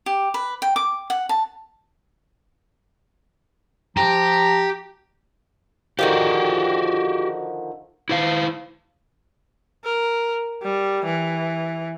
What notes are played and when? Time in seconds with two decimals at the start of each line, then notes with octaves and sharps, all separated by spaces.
0.06 G4
0.34 B4
0.62 G5
0.76 D6
1.10 F#5
1.29 A5
3.97 F3 G4 A#5
5.99 D3 D#3 F3 F#4 G4
8.09 E4 C5 F5
9.84 A#4
10.62 G3
11.05 E3